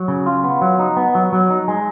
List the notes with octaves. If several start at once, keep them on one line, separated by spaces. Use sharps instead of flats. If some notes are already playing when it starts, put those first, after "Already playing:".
Already playing: F#3
C#3
F4
B3
F#3
D#4
B3
F#3
F#3
D#4
G#3